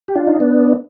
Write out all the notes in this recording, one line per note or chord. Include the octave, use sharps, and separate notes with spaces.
G4
D4 F4
D#4
B3 D4